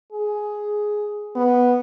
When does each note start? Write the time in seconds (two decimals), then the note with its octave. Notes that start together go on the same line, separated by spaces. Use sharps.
0.12 G#4
1.35 B3